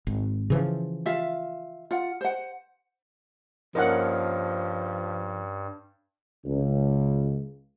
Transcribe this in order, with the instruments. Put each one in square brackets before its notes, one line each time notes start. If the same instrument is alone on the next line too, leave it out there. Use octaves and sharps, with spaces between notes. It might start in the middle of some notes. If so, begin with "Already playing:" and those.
[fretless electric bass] G#1
C#3 E3 F3
[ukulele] F4 E5 F5
F4 F#5
C5 F#5
[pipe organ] G2 [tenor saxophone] F3 [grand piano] A#3 C#4 D#4 [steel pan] A#4 F#5
[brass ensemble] C#2